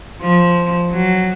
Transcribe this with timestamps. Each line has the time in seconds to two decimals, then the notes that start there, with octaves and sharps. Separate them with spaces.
0.22 F3
0.91 F#3